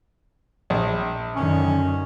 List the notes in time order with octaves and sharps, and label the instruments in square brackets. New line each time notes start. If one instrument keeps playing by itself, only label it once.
[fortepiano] A#1
[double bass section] F#2 D3 D#3 [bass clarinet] C#4